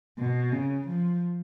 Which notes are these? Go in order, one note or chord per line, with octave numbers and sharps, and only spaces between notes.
B2
C#3
F3